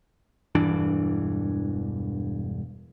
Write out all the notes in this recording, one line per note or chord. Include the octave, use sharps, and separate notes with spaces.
E1 G2 E3 D4